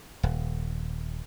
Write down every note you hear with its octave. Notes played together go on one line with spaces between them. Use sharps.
D#1